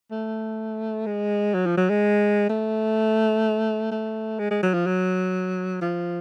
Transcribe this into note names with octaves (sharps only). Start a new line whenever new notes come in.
A3
G#3
F#3
F3
F#3
G#3
A3
A3
G#3
G#3
F#3
F3
F#3
F3